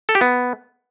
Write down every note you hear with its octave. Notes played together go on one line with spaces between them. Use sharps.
A4
G4
B3